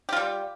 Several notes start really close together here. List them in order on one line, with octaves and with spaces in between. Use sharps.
G4 F4 G3